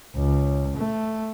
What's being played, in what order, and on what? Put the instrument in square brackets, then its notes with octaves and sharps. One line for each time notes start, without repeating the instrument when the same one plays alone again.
[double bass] C#2
A3